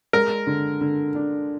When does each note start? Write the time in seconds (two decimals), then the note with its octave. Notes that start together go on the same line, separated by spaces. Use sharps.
0.13 G#3 A#4
0.47 D3
0.81 D3
1.15 D4